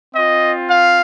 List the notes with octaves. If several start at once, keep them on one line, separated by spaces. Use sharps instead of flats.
C4 F4 D#5
F5